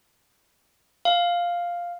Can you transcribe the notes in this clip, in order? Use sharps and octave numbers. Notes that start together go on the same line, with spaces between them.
F5